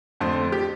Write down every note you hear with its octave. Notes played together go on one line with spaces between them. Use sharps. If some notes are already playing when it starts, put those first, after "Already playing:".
F2 D3 A3 C4 C5
G4